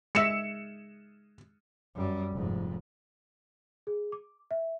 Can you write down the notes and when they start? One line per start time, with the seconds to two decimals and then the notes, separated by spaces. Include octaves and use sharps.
0.15 G#3 E5 C#7 E7
1.96 F#2 G3
2.32 F1 G#2
3.87 G#4
4.12 D6
4.51 E5